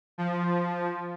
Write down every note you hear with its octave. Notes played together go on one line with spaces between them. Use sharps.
F3